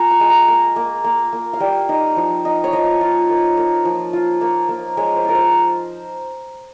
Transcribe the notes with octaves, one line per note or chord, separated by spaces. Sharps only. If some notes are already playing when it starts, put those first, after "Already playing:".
Already playing: A#3 F4 G#5 A#5
C#6
G#3
A#5
A#3
A#3
A#3
A#3
F5
G3 G5
D#4
F3
D#4
C#5
F3 D#5
F4
A#3
A#3
F3
F4
A#3
A#3
G#3 C#5
C5
F4 A#4
C5